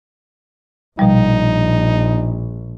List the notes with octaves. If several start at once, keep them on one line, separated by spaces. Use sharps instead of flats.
A#1 B2 F3 G3 D#4